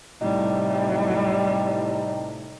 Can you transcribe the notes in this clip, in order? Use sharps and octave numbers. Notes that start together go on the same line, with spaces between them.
A2 C3 G3 D#4